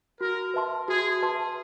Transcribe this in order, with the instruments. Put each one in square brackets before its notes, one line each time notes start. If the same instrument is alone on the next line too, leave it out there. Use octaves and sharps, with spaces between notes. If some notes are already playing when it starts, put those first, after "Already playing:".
[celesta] F#4 [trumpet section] A#4
[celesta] B4 E5 A5 C6
[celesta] F#4 [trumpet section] G#4
[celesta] B4 E5 A5 C6